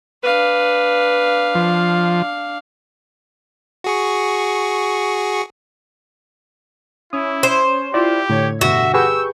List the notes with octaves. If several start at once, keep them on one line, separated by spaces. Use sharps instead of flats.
D4 B4 F5
F3
F#4 G#4 C#6
C#4 E4 C#5 D#6
C5
E4 F4 G4 D5
A2 D3 C#5 G#6
G2 B2 D3 F#4 E5
G4 G#4 B4 C#6 E6 G6